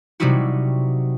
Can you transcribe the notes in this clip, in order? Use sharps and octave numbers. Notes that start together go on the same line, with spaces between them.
C3 F#3 G3 D#4 E4 F#4